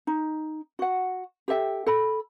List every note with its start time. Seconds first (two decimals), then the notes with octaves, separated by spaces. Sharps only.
0.07 D#4
0.79 F#4 F#5
1.48 G4 A4 E5 G5
1.87 A4 B5